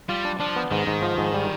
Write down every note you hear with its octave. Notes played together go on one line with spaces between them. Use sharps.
G3 F4
D4
F3 D4
B3
G#2 D#3
G#2
F3
G#2
G3